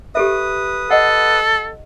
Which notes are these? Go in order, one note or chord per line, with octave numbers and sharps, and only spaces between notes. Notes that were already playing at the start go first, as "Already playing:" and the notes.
G4 A4 B4 E5 D#6
A4 D#5 F#5